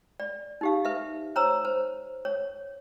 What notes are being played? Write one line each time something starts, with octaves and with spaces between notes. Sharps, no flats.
D5
D#4 G4 F5
B4 E5
C5 C#5 A#5 E6
C5
C#5